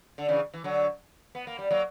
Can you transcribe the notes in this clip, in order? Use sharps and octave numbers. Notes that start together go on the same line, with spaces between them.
D3
C#3 E3
E3
D3 F#3
B3
A#3
G3
F#3 A#3